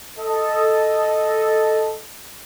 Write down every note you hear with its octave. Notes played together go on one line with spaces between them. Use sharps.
A4 D#5